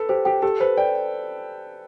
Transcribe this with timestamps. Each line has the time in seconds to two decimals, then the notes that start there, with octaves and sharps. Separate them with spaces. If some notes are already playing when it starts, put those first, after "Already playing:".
Already playing: A4 B4
0.09 G4 C5
0.25 G4 G5
0.42 G4 A4
0.60 B4 C5
0.77 D5 G5